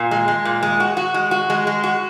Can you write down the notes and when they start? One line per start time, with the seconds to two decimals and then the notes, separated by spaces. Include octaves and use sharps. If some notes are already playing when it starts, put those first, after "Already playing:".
Already playing: A#2
0.11 G#3
0.28 G#3
0.45 A#2
0.63 G#3
0.80 F#4
0.97 F#4
1.14 G#3
1.31 F#4
1.50 G#3
1.67 G#3
1.84 F#4